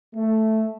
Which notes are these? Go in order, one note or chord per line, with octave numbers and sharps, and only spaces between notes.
A3